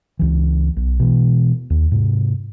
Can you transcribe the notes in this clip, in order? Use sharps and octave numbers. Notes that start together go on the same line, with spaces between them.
C#2 E3
B1
B2 E3 G#3
D#2
G#2 C3